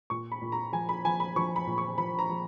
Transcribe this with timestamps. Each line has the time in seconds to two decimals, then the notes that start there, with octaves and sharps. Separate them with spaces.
0.10 A#2 C#6
0.32 B5
0.42 A#2
0.52 A#5
0.73 F3 G#5
0.89 B5
1.05 F3 G#5
1.20 B5
1.36 F3 C#6
1.56 B5
1.67 A#2
1.78 C#6
1.98 F3 B5
2.19 A#5
2.30 F3